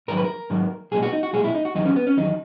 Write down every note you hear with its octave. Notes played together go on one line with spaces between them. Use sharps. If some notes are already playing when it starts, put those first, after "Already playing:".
G#2 D#3 F#3 A#4
B4
A#4
G#2 D#3 F#3
B1 A#2 G#3 G#4
F#4
D#4
F#4
B1 A#2 G#3 G#4
E4
D#4
F#4
E2 D#3 F#3 D#4
C#4
B3
C#4
E2 D#3 F#3 D#4